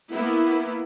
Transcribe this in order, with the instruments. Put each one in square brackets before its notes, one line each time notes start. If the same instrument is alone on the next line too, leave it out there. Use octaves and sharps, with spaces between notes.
[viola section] A#3 B3 E4